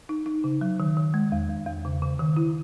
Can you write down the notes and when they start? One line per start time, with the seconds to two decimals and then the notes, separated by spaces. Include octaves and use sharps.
0.09 D#4
0.26 D#4
0.44 C#3
0.61 F#3
0.80 D#3
0.97 D#3
1.14 G#3
1.32 E2
1.49 E2
1.66 E2
1.85 C#3
2.02 C#3
2.19 D#3
2.37 E4